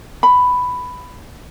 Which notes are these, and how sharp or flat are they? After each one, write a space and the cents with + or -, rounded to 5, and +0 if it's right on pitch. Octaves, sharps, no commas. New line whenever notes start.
B5 +10